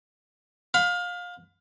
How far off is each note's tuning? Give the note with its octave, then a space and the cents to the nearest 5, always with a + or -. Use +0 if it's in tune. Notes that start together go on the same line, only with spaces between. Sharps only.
F5 +25 B5 +40